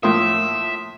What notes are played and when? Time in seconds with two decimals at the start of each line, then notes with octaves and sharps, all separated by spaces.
0.03 A2 F3 A#3 E5 C6 D#6